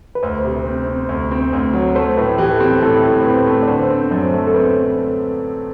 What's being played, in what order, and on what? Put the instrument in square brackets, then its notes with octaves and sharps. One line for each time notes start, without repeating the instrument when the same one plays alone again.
[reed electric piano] B4
[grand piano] D2 [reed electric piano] C5
[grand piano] C3
C4
C4
D2
C4
D2
F#3
[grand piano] A3 [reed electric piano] C5
[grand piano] A2 [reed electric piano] B4
[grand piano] E3 [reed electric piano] G4
[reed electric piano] A4
[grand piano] C4 [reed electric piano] G4
[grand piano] A2 [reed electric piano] A4
[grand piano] A2
[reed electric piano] C5
[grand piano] C4 [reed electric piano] B4
[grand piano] A3
[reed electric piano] D5
[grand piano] D3 [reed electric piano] C5
[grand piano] C4
[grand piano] F#2 [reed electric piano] C5
[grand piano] A3
[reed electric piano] A4
[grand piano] C4 [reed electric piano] B4